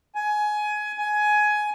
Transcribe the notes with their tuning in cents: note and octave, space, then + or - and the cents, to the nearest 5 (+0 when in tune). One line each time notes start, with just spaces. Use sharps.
G#5 +20
G#5 +15